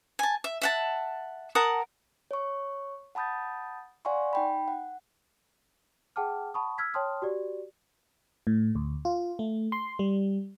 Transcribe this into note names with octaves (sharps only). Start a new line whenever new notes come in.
G#5 A5
E5
E5 F#5 A5
A#4 F#5 A5 D#6
C#5 C#6
F#5 A5 B5 D#6 G6 A6
D5 F5 F#5 G#5 C6 C#6
D#4 G5 B5
F#5
G#4 F#5 G5 A5 D6 F6
F#5 A5 B5 C#6 D#6
E6 F6 G#6 B6
C#5 G5 A5 C6 D#6 F6
F#4 G4 D5
A2
D2
F4
A3
C6
G3